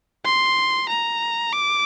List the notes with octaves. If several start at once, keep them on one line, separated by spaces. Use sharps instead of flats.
C6
A#5
D6